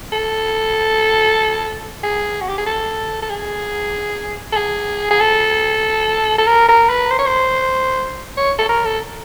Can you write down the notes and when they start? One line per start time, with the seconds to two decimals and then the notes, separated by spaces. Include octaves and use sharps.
0.13 A4
2.04 G#4
2.41 F#4
2.49 G4
2.58 G#4
2.67 A4
3.22 A4
3.30 G#4
4.52 A4
4.57 G#4
5.11 G#4
5.20 A4
6.38 A4
6.47 A#4
6.69 A#4
6.90 B4
7.11 C5
7.19 C#5
7.26 C5
8.37 C#5
8.59 A4
8.69 A#4
8.85 A4